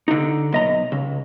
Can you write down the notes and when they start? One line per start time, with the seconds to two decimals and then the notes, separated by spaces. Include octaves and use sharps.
0.08 D3 D#4
0.53 B1 D#5 A#5
0.92 C#2